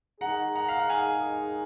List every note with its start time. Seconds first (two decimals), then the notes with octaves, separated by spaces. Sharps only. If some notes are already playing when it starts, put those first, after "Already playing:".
0.21 D#3 G#3 D#4 G#4 F#5 A#5
0.55 F#5 A#5
0.69 F5
0.79 F#5
0.89 F5 G#5